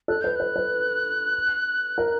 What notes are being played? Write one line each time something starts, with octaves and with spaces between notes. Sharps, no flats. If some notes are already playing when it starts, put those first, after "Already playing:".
A4 F#6
B4 G6
B4 F#6
B4
A#4